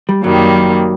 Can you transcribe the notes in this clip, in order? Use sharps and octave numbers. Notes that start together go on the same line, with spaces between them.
G3
F#2 D#3 F#3 G3 A#3